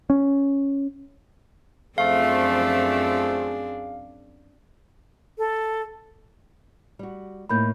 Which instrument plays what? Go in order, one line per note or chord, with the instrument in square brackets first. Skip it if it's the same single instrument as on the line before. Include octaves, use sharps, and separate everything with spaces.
[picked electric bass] C#4
[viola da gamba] F#2 C4 D4 [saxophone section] F3 A3 [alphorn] G#4 [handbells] F5
[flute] A4
[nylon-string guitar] G3 F#4
[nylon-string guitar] A2 A#3 D#4 [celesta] B5 G6